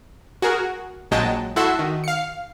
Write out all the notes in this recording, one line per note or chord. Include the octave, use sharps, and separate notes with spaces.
F#4 G#4 A#4
A#1 F#3 G#3 D#5 G5 A5
E4 F#4 A4 E5 C6
D#3
F5 C#7